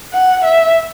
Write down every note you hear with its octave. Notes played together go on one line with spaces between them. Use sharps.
F#5
E5